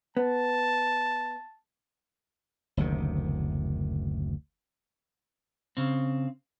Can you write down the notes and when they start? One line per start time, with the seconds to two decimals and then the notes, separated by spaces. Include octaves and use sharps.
0.17 B3 A5
2.77 F#1 D2 C3 D#3
5.77 C#3 C4